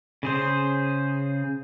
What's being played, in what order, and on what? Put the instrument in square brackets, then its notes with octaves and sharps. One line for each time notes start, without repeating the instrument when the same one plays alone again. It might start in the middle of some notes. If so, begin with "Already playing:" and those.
[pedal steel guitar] C#3 G#4 C5